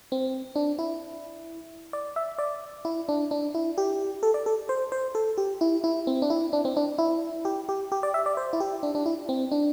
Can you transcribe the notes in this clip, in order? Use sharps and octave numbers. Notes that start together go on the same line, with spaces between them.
C4
D4
E4
D5
E5
D5
E4
D4
D4
E4
G4
A4
D5
A4
C5
C5
A4
G4
E4
E4
C4
D4
E4
D4
C4
D4
E4
G4
G4
G4
D5
E5
D5
C5
E4
G4
D4
D4
E4
C4
D4